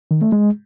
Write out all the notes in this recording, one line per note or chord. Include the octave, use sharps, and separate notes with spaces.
D#3
A3
G#3